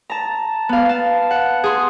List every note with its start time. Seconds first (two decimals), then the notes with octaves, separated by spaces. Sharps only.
0.10 A5 A#5
0.69 B3 F5
0.89 A5
1.31 F#5
1.64 G#4 C6